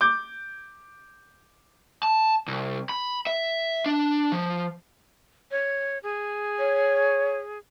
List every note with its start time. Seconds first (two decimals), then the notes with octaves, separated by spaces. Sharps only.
0.01 D6 G6
2.03 A5
2.48 C2
2.89 B5
3.27 E5
3.86 D4
4.32 F3
5.51 C#5
6.03 G#4
6.59 C#5